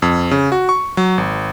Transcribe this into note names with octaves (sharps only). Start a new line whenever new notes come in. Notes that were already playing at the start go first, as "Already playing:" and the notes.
F2
C#3
F#4
C#6
F#3
G#1